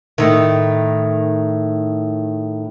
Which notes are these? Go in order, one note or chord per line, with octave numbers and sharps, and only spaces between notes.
A2 D#3